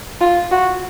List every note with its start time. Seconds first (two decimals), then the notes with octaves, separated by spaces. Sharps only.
0.21 F4
0.51 F#4